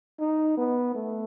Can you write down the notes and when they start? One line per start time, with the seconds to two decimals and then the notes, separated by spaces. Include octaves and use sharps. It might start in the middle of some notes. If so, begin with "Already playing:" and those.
0.20 D#4
0.58 B3
0.95 A3